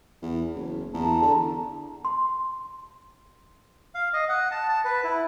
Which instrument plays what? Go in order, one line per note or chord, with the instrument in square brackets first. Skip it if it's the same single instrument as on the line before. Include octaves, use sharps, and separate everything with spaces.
[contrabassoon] E2
F#1
[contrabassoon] E2 [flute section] A5 A#5
[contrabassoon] D3
[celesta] C6
[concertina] F5
D#5
F#5
A5
A5
B4
E4